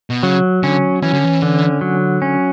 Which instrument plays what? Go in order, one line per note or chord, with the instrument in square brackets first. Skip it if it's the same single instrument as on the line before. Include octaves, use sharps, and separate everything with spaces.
[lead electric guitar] B2
[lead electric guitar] C#3 [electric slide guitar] F#3
[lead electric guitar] D3 [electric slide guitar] C#4
[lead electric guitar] E3 [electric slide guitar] C#4
[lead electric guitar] D3
E3
[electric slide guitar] D3
F#3
C#4